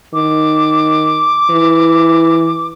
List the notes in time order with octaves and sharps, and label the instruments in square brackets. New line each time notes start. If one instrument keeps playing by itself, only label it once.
[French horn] D#3 [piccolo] D6
[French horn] E3